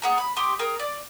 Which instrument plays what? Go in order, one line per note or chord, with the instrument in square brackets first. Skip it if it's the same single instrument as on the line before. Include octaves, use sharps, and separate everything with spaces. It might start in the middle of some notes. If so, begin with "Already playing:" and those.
[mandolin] G#4 F#5 A#5
B5
G4 G5 C6 D#6
G#4 A#4 G5
D5